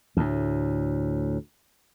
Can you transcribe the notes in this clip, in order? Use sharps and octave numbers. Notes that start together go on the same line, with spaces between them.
D2 A2